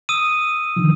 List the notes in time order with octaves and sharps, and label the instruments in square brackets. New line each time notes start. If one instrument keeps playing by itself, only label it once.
[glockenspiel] D#6 E6 D#7
[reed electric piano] D3 D#3 F3